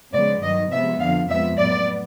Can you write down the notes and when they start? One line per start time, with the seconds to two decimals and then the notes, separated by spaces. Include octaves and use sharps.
0.13 C#3 F3 G#3 B3 D5
0.42 G2 D#3 F#3 D#5
0.71 C3 F3 G#3 B3 E5
1.00 F2 D3 F3 F5
1.29 F2 C3 F3 G#3 B3 E5
1.59 A2 F#3 B3 D5